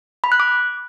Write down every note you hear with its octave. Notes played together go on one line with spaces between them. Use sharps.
B5
F#6
D6